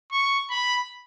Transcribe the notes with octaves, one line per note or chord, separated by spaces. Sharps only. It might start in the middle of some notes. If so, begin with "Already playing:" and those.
C#6
B5